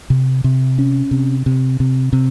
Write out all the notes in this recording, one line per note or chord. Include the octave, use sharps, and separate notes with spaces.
C3
C3
C#4
C3
C3
C3
C3